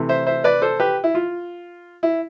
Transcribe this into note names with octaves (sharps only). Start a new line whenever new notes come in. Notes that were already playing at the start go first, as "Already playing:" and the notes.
Already playing: C3 E3 A3
C5 E5
C5 E5
B4 D5
A4 C5
G4 B4
E4
F4
E4